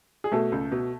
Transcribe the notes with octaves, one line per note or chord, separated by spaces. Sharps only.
G#4
B2 A3 A4
C#2
B2